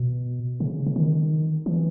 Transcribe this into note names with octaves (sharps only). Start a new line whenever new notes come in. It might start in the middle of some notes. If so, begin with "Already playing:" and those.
Already playing: B2
C#3
C#3
D#3
E3